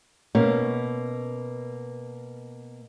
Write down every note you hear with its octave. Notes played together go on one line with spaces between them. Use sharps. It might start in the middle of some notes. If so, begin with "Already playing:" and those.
B2 A#3 B3 C#4